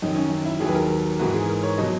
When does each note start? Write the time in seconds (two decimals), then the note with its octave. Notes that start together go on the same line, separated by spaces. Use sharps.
0.02 F#2 D#3 F#3 D#4
0.16 C#4
0.46 E4
0.60 D#2 D#3 F#3 G#4
0.68 B4
0.75 A#4
1.19 G#2 E3 F#4
1.34 G#4
1.49 A#4
1.63 C#5
1.78 B2 F#3 D#5